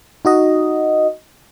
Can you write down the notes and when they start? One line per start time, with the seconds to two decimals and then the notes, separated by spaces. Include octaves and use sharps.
0.25 D#4 F#4 D#5